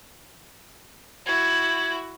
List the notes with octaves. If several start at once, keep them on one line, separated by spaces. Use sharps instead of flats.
E4 F#4 G#6